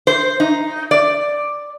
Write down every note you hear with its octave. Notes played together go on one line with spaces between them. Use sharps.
C5
D#4
D5